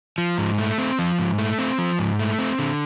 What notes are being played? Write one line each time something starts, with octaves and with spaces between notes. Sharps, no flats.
F3
G#2
A3
C4
F3
G#2
A3
C4
F3
G#2
A3
C4
D3